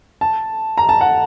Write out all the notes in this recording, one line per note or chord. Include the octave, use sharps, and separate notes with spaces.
A5
A#5
A5
F#5